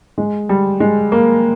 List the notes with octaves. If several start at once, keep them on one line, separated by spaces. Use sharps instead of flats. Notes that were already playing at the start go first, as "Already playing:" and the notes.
G#3
G3
G#3
A#3